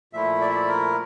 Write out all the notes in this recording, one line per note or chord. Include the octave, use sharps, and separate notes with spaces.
A#2 F3 A3 E4 E5
D5
E5
D5
A#4